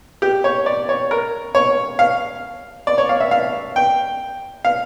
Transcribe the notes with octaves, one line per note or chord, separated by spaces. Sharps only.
G4
C#5
D5
C#5
A#4
C#5
F5
D5
C#5
F5
E5
F5
G5
F5